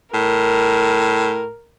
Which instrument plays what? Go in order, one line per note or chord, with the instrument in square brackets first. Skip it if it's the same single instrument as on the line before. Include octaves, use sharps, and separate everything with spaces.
[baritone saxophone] A2 [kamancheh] A#4